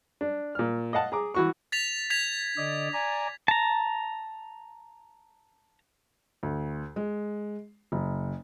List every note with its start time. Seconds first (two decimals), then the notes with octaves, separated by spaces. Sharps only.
0.21 D4
0.55 A#2 F6
0.93 D#5 F5 F#5 A5
1.12 G#4 A#5 D6
1.34 E3 F#4 C#6
1.72 A6 B6 F7
2.10 G#6 B6 F7
2.57 D3 D5 D#5
2.93 D5 G#5 A#5
3.48 A5 A#5
6.43 D2
6.96 G#3
7.92 F#1